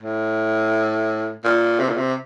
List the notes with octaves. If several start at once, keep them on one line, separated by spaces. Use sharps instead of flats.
A2
A#2
C3
A#2
C3